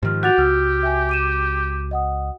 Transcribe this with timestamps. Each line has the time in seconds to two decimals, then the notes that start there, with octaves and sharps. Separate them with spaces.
0.03 G#2 D#3 F3 G4 F6
0.23 F#4 G4 F#5 A6 F7
0.38 C#2 E6 F6
0.83 E5 G5 G#5
1.09 D6 D#7 E7
1.91 D#5 F#5 D#6